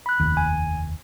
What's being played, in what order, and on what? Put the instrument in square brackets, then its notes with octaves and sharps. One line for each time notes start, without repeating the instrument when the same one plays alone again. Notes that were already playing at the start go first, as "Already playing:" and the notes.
[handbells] B5 F#6
[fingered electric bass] F1 D#2
[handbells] G#5